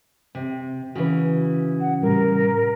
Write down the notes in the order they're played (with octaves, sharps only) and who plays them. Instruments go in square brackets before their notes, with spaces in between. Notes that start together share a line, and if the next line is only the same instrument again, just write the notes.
[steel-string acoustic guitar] C3
[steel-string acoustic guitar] C#3 E3 [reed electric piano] F#4 B4
[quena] F#5
[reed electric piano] A2 C3 G3 [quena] A#4